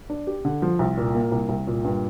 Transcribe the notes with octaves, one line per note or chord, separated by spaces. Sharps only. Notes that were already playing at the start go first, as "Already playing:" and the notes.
D4
G4
D3
F3
C2
A#2
A#3
C2
C2
A#2
G2